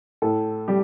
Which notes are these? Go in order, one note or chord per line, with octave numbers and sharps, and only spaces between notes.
A2 A4
G3 G4